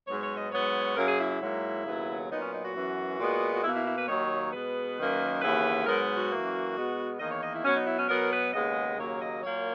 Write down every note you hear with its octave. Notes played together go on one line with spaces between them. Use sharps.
G#2 F#3 B3 C#5
C#5
D#5
G#2 F#3 B3 C#5
F#2 C#3 F#3 A#3 A#4
G#4
E4
E4
G#2 F#3 A#3
D#2 C#3 F#3 B3
A#2 F#3 B3 D#4
C#4
D#4
F#4
F#2 E3 B3
A#2 G#3 B3
F#4
B2 A#3 E4
E4
E4
B4
D#2 D#3 F#3 A#3 C#5
B2 G#3 B3 B4
F#2 D#3 A#3
D#2 C#3 E3 B3 B4
G#2 F#3 B3 A#4
F#4
F#2 E3 A#3
B2 G#3 B3
E2 D#3 A#3 D#5
C#5
D#5
E4
B2 F#3 B3 C#4
D#4
E4
C#4
B2 F#3 B3 A#4
B4
D#2 C#3 G#3 B3 D#5
D#2 C#3 F#3 A#3 C#5
D#5
A#2 F#3 A#3 C#5